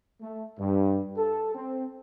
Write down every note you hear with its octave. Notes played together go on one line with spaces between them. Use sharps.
A3
G2
A4
C4